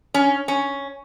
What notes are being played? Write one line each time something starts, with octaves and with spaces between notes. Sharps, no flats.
C#4
C#4